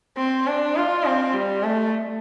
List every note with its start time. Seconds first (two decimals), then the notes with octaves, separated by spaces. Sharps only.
0.17 C4
0.47 D4
0.76 F4
1.05 C4
1.34 G3
1.63 A3